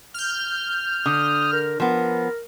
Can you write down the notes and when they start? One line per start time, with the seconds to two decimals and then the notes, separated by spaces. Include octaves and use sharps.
0.14 F6 G6
1.06 D3 D#6
1.53 A#4
1.80 F3 B3 A#4